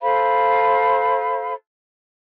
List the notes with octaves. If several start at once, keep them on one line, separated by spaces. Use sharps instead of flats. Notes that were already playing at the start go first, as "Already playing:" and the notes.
A4 C5 F5 B5